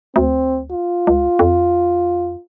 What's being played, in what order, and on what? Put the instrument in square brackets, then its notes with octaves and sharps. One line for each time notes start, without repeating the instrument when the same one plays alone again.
[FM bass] D2 [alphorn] C4
[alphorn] F4
[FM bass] C#2
F2